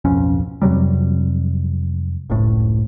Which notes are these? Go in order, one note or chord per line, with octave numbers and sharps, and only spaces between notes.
D1 B1 F2 C#4
F2 C3 F#3 G3
F#1 C#2 A2